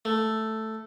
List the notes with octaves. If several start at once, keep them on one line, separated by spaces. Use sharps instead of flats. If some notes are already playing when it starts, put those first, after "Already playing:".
A3